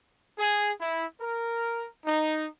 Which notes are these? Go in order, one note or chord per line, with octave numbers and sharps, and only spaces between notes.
G#4
E4
A#4
D#4